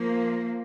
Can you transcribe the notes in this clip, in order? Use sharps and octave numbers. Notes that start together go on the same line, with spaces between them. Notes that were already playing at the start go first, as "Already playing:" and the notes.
Already playing: F3 A#3